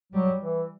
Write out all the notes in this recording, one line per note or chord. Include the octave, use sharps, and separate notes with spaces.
F#3 G3
E3